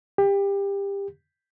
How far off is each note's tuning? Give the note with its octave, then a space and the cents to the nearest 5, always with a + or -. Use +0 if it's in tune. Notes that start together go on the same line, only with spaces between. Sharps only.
G4 +25